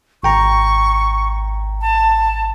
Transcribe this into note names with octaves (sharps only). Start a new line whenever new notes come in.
G#1 G5 A#5 C#6
A5